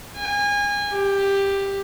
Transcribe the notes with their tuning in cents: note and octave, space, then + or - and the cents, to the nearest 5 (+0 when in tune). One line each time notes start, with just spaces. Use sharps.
G#5 -30
G4 +10